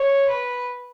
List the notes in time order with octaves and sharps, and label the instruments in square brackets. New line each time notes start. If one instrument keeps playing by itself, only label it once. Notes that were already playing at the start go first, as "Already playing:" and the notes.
Already playing: [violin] C#5
B4